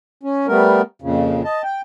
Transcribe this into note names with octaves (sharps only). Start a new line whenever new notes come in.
C#4
G3 A3 B3 A#4
F2 A#2 C#3
D#5 A5
G5